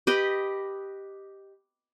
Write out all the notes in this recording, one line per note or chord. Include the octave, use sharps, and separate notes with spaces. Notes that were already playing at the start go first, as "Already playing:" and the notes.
G4 B4 D#5